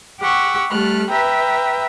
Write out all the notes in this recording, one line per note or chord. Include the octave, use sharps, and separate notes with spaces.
G4 F#5 C#6 E6
G3 A3 F6 F#6
B4 E5 G5 A#5